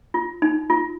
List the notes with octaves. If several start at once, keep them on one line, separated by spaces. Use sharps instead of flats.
F4
D#4
F4